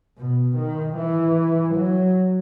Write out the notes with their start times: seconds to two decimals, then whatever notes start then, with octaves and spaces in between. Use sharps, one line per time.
0.18 B2
0.57 D#3
0.96 E3
1.75 F#3